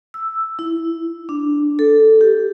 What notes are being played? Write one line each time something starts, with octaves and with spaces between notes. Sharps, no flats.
E6
E4
D4
A4
G4